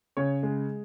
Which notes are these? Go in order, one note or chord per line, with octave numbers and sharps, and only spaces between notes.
C#3 C#5
G#3